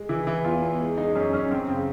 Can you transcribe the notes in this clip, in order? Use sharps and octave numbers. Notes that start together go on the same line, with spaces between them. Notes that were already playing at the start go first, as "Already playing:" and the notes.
Already playing: G#3
E3 E4
E3
E2 F4
E2
G#3
G#3 D#4
F#2 C#4
F#2 C#4
F#2 C4
C#3 C4